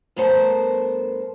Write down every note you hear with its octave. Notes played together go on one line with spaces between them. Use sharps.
G2 A3 B3 A#4 C5 A5